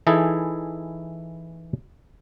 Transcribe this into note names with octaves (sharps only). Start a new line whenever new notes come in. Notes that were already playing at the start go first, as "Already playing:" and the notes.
E3 D#4 E4 G#4 A4